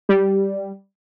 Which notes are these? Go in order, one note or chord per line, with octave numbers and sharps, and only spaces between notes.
G3